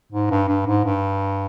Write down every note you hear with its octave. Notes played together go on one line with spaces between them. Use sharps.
G#2
G2
G2
G#2
G2